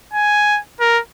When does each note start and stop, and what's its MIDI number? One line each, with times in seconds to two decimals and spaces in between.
0.13 0.60 80
0.80 1.00 70